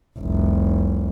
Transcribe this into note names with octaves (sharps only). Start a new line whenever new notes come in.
F1 C2